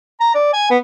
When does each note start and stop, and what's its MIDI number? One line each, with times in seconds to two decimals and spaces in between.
0.20 0.30 82
0.34 0.51 74
0.53 0.70 80
0.70 0.77 59